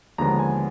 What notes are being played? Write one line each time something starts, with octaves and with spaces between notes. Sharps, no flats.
D#2 D3 F3 G#3 B3 A#5
G#5